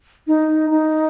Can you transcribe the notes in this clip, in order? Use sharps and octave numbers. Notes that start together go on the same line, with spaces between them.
D#4
D#4